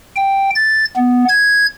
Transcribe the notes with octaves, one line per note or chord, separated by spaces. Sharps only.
G5
A6
B3
G#6